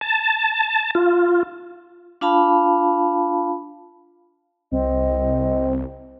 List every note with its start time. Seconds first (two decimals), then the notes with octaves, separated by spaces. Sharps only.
0.01 A5
0.95 F4
2.21 D4 F4 F5 A5 B5
4.72 C2 C4 D#5